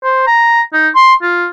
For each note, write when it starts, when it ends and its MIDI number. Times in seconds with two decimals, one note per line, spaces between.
0.03 0.24 72
0.27 0.61 82
0.73 0.88 63
0.95 1.14 84
1.23 1.47 65